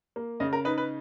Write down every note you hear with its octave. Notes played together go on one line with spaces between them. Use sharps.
A#3
C#3 D#5
A#4
D#4 B4
B4